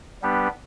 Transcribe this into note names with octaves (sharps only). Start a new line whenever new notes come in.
G3 B3 D4 G4 B4